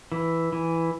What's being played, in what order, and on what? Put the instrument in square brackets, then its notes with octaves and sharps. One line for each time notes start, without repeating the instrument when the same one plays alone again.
[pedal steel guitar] E3
E3